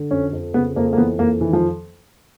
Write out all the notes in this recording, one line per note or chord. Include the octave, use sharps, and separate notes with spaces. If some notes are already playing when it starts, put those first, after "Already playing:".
Already playing: D3
F2 C#4
F2
C#3 B3
F2 A#3
A#3
E3 B3
F2 A#3
D#3 E3
F3